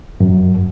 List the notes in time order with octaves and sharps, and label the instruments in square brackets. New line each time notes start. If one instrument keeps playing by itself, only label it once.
[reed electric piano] F#2